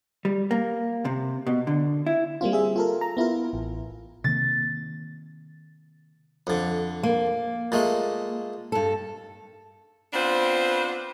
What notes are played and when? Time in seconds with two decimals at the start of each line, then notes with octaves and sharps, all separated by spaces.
0.25 G3
0.51 A#3
1.05 C3
1.47 B2
1.67 D3
2.06 E4
2.41 G3 A#3 C4 F4
2.53 G#4 E5
2.76 F4 A4 A#4
3.01 A#5
3.17 B3 E4 F4 A#4
3.53 A1
4.24 C3 D#3 A#3 A6
6.47 F2 D3
7.03 A#3
7.72 A#2 G#3 A3
8.72 G2 A4
10.14 B3 C4 D4 F4 C5